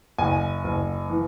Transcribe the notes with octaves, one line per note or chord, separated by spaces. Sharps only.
F#1 G#5
F#1
E3